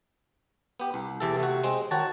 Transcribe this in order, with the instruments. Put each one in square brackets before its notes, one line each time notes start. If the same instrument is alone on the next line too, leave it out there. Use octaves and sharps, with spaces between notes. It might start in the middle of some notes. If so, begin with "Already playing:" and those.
[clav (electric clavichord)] B3 G4
C2
[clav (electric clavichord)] E2 E3 A4 [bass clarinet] C3
[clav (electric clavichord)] A3 F#4
G#3 C4
[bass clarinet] D#3 [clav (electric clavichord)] F#4 C#5 A5